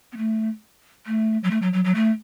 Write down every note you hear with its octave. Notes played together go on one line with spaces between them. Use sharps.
B3
A3
A3
F#3
A3
F#3
F#3
F#3
A3